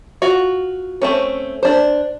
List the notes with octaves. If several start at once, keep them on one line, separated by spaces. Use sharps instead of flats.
F4 F#4
A3 C4 C#4
D4 C5